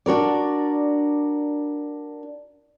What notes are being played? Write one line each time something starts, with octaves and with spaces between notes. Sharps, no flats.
D4 F#4 A#4 D5